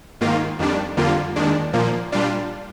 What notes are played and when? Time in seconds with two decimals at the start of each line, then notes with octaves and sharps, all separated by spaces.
0.21 G#2 D#3 A#3 F4
0.59 F2 D#3 G3 D4
0.97 F2 D3 G3 A#3 F4
1.36 D#2 D#3 G#3 D4
1.73 A#2 F3 A#3
2.12 A#2 G3 D4 F4